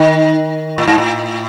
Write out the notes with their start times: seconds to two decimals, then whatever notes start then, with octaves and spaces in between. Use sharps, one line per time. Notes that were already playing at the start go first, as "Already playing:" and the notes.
Already playing: D#3
0.78 A2
0.87 G#2
0.98 A2